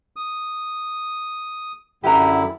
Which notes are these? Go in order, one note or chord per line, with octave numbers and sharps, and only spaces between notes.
D#6
F#2 D3 E4 G4 B4 A#5